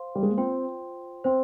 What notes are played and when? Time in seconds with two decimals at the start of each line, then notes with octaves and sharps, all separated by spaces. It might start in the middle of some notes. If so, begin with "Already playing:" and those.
Already playing: C5 F5 C6
0.15 G3
0.23 G#3
0.30 A#3
0.37 C4 F4 C5 G5 C6
1.24 C4 C5 G5 C6